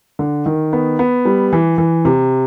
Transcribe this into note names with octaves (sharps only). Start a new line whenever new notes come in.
D3
D#3
B3
B3
G3
E3
E3
C3